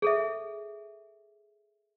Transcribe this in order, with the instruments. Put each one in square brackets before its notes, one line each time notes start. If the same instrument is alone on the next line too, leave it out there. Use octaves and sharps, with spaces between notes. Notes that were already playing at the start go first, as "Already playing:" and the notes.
[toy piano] G#4 A4 E5